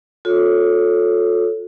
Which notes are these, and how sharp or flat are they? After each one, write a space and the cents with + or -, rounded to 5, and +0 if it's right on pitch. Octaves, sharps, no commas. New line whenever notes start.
F4 +45 A4 +0 C#5 +0